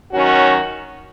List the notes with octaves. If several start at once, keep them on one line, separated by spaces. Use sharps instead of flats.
D#3 F#3 C#4 F#4